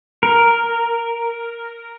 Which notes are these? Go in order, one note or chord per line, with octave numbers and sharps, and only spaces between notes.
A#4